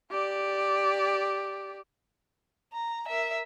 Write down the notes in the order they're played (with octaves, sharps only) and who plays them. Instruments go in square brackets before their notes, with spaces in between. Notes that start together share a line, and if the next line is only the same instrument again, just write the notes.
[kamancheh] G4 D5
[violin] A#5
A#4 E5